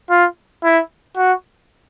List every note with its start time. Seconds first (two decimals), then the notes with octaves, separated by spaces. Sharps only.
0.10 F4
0.64 E4
1.16 F#4